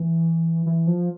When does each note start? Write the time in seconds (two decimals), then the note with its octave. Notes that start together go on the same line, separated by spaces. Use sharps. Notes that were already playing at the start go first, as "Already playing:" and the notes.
Already playing: E3
0.66 E3
0.87 F3